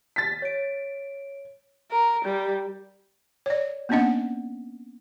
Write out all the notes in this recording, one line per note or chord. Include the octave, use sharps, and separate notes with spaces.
A6 B6
C#5 D7
A#4
G3
C#5 D5
A#3 B3 C#4 D4 D#5 F#5